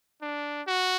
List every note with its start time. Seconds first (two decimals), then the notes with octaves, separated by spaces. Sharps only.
0.22 D4
0.67 F#4